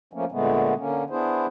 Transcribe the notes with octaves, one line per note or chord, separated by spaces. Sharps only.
F3 A3 A#3 C#4
A#2 D3 G#3 A3 B3
D3 A#3 C#4
B3 D4 E4 G#4 C5